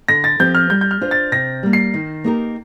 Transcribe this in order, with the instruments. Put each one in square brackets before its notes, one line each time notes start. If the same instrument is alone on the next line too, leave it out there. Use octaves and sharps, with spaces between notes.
[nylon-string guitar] D3 [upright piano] A#6
[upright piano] A6
[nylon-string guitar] F3 C4 G4 [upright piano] G6
[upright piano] F6
[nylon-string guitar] G3 [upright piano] G6
[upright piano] G6
F6
[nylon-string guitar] D4 F4 C5
[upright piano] A6
[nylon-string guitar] C3 [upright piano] A#6
[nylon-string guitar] G3 A#3
[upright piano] C7
[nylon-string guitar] D#3
A#3 D#4 G4 A#4